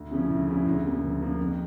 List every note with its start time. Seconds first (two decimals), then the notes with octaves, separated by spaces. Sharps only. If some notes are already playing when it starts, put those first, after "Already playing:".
Already playing: D2
0.11 C#3 F3 C#4 E4
0.30 D2
0.48 C#3 F3 C#4 E4
0.66 D2
0.85 C#3 F3 A#3
1.03 D2
1.21 C#3 F3 A#3
1.39 F2